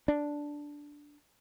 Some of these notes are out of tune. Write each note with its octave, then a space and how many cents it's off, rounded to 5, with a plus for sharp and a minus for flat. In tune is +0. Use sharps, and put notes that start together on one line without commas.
D4 -5